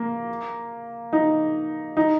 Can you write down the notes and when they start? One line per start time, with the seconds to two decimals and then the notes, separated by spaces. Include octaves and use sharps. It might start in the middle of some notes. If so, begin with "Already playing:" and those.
Already playing: A#3
1.13 D#4
1.97 D#4